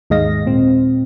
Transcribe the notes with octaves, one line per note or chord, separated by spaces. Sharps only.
D#2 G#2 G#3 D#5 F5 A#6
A#2 C4